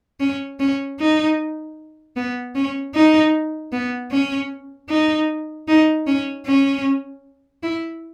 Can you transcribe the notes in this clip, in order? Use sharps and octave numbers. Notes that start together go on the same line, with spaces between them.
C#4
C#4
D#4
B3
C#4
D#4
B3
C#4
D#4
D#4
C#4
C#4
E4